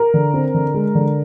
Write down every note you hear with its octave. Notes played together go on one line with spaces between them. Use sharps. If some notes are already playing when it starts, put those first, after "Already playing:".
Already playing: A#4
D3
C4
D3
G#3
D3